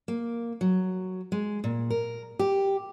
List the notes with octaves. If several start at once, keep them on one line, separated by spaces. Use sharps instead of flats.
A#3
F#3
G#3
A#2
A#4
G4